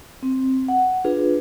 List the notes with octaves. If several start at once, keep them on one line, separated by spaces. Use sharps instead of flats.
C4
F#5
D4 F4 G#4 B4